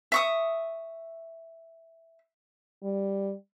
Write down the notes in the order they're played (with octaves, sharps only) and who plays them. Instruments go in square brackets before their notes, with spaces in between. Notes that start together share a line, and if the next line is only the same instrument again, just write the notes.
[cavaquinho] E5 C#6 D#6
[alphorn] G3